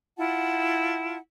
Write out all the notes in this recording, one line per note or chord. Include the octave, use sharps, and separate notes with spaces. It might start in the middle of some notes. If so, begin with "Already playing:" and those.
E4 F4 F#5 A5